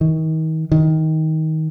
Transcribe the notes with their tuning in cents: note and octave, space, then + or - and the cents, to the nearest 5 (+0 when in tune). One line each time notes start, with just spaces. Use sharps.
D#3 +35
D#3 +20